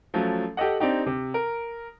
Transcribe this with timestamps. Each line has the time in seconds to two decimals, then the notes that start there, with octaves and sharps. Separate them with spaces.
0.14 F3 F#3 A3 C#4
0.57 G4 A4 D#5 F#5
0.80 C4 D4 D#4 G4
1.06 C3
1.34 A#4